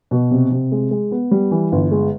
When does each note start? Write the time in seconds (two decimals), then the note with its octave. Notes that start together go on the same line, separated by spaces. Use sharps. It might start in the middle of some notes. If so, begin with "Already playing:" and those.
0.11 B2
0.31 C3
0.51 C3
0.72 G#3
0.91 G#3
1.11 B3
1.31 G3
1.51 E3
1.72 G1
1.91 G#3